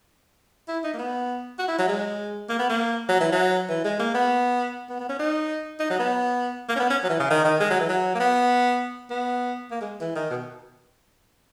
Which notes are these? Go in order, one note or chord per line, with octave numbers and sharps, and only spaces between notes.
E4
D#4
A#3
B3
F#4
E4
F#3
G#3
A#3
B3
A#3
F#3
E3
F#3
E3
G#3
A#3
B3
B3
B3
C#4
D#4
D#4
F#3
B3
A#3
C#4
B3
C#4
F#3
E3
C#3
D#3
D#3
G#3
F#3
E3
F#3
A#3
B3
B3
A#3
G#3
E3
D#3
B2